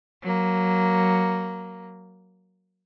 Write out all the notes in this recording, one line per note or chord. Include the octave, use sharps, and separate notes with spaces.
F#3 A#3